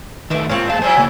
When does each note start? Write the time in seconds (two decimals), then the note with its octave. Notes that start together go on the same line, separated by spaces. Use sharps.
0.30 D#3 A3 B4 E5 D6
0.49 G#2 A#3 C4 F4 C#5 F5 C#6
0.70 F2 G#3 A#3 F5 A5
0.82 F3 F#3 E4 G#4 C5 E5 G#5
0.97 C#3 A#3